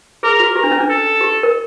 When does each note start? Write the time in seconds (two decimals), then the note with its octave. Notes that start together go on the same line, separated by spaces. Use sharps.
0.23 G#4 A#4
0.40 F#4
0.56 G4 A#4
0.64 D4
0.72 C#4
0.80 D4
0.89 A4
1.21 G4
1.43 A#4